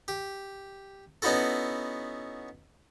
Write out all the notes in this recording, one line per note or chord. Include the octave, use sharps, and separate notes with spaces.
G4
B3 C#4 D#4 E4 F#4 A4